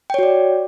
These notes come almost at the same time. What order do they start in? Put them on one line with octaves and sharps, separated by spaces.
G5 C#5 F#4 D5